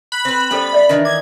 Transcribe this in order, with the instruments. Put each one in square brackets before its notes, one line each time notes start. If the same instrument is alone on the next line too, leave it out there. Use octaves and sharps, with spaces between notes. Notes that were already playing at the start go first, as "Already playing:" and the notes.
[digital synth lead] B5 [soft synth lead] F#6
[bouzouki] C4 B4
[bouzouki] G3 B3 B4 [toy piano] C#4 A4 C5
[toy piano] D5 E5
[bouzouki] D#3 E3 [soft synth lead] D4 [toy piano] D#5
[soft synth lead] D6 [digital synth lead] G#6